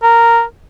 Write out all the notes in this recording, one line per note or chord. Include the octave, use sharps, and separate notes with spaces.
A#4